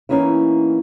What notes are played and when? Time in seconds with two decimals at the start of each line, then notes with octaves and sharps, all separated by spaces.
0.09 E3 A#3 B3 C#4 D#4 E4